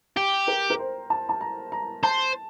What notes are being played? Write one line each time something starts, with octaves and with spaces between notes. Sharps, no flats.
G4 G5
A#4
A#4
C5
A5
A5
A#5
A#5
C5 A5